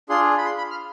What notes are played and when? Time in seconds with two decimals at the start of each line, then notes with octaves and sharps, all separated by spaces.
0.09 D4 F4 G#4 C6
0.38 B5
0.46 C6
0.58 B5
0.71 F6